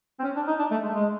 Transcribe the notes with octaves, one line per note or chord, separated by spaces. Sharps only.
C4
C#4
D4
D#4
D4
A3
G#3
A3
G#3